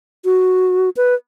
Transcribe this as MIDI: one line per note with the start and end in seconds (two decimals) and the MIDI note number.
0.25 0.90 66
0.97 1.14 71